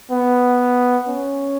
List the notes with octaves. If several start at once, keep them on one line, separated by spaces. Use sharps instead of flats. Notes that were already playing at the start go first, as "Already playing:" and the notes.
B3
C#4